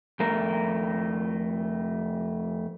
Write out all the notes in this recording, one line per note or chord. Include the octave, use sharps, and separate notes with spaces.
F2 A3 A#4